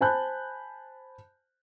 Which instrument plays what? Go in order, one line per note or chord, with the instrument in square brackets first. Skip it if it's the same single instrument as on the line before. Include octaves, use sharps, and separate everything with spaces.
[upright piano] C5 G#5 A5 B5 F#6 G6